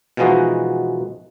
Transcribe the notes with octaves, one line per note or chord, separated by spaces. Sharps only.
B2 E3 F3 G#3 D#4 F#4